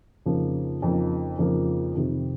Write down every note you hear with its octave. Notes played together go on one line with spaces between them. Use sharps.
F2 C#3 F3 A#3 D#4
F2 C#3 F3 A#3 D#4
F2 C#3 F3 A#3 D#4
F2 C3 D#3